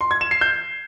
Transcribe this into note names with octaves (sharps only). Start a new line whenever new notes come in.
C6
G#6
E7
C7
G6